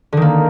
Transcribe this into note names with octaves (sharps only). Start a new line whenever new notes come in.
D3 D#3 A#3